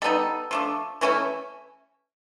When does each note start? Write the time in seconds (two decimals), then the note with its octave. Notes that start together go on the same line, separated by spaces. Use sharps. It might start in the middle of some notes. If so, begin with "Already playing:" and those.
0.02 G3 B3 D#4 A4
0.51 F3 A3 D4
1.01 E3 A3 C#4 E4